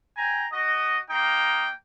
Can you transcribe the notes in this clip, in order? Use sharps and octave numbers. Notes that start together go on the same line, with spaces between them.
G5 G#5 A#5
F#4 D#5
A#3 D#4 G5